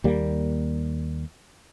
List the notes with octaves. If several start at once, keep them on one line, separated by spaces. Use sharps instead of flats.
D#2 G3 A#3